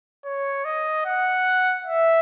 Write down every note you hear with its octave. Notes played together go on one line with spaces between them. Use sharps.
C#5
D#5
F#5
E5